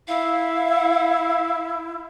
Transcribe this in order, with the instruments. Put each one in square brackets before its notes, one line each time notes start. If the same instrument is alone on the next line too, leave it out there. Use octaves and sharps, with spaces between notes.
[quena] E4 [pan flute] F5